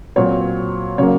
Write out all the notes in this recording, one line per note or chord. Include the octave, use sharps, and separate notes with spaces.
A#2 F#3 C4 C#5
C#3 F#3 A#3 C#5